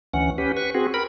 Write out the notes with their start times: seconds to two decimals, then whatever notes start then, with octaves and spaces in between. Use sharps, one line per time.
0.13 D2 E3 C#4 F#5
0.38 C#4 G4 B4
0.57 B4 C#6
0.75 C4 F#4 G#4
0.94 A#4 B5